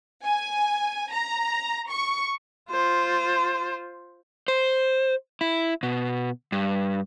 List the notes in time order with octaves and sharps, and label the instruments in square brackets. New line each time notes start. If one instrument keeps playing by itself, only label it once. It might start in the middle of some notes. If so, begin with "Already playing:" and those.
[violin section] G#5
A#5
C#6
[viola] F4 C5
[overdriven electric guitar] C5
E4
B2
G2